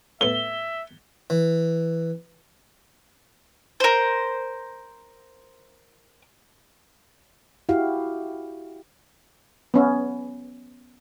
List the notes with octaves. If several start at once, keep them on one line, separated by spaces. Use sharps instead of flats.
A2 B3 E5 G7
E3
A#4 C5
E4 F#4 G4 F5
B3 C#4